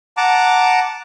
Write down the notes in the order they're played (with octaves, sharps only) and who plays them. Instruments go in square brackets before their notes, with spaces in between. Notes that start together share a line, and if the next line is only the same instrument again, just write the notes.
[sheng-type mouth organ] F#5 A5 A#5 D6